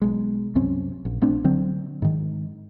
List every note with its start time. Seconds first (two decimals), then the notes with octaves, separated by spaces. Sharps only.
0.02 B1 G#3
0.55 C2 F#2 C4 C#4
1.05 A#1
1.21 A#1 A3 C4 D4
1.44 D3 F#3 C4
2.02 G#2 D#3